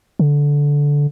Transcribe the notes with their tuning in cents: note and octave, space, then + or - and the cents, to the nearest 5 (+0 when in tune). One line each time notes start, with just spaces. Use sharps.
D3 -15